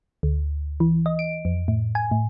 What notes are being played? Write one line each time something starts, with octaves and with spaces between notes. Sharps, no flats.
D2
E3
D#5
D7
F2
A2
G#5
A2